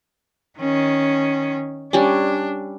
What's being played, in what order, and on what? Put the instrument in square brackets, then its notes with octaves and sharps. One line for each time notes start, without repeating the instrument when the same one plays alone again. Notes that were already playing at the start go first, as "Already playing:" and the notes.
[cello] D#3 C#4
[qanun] G3 C#4 [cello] D4